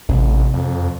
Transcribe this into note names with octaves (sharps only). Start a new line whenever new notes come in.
A1 C3
F2